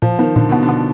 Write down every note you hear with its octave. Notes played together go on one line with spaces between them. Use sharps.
A#2 F3
D#3 B3
A#2 D3
B2 B3
D3
B3